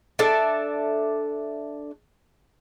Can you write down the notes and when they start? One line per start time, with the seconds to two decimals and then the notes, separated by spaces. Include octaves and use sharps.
0.19 D4 A4 D5 E5